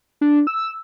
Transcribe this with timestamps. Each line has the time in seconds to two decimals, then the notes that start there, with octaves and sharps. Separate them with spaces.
0.21 D4
0.47 E6